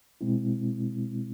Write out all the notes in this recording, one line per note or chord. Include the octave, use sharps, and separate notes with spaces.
B2 G#3 C4 E4